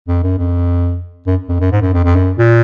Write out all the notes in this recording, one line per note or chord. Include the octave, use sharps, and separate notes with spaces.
F2
F#2
F2
F#2
F2
F#2
G#2
F#2
F2
F2
F#2
A#2